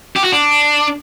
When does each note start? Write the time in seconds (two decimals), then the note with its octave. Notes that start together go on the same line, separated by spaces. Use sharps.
0.16 G4
0.24 F#4
0.32 D4